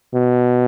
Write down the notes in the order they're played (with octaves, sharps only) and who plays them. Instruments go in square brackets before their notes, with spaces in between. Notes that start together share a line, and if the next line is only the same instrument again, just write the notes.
[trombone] B2